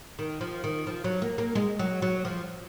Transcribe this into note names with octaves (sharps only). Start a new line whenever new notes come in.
D#3
F3
D#3
F3
F#3
A#3
A#3
G#3
F#3
F#3
F3